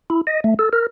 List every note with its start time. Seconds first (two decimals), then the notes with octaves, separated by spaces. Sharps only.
0.10 E4
0.27 D#5
0.44 A3
0.59 A4
0.73 A#4